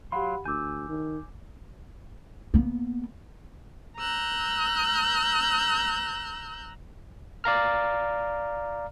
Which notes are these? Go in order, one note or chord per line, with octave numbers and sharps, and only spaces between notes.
F#3 G4 F5 F#5 B5 C6
D2 G#5 D6 E6 G6
D#3
A#3 B3
A#5 E6 F#6 G6
D5 F5 A#5 F6